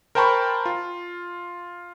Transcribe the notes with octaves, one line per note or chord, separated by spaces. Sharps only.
A#4 C5 G5 A5 B5 C#6
F4